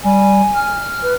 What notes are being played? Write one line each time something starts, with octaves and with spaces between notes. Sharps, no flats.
G3 G#5
F6
B4